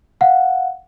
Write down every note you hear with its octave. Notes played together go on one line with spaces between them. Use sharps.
F5 F#5